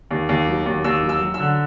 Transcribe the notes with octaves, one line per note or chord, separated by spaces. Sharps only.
D#2
D#2
F#3
D#2
D#2 E6
F#3
E6
F#3
E6
D3